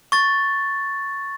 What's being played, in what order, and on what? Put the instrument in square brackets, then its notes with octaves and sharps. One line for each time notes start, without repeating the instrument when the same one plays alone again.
[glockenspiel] C#6 A6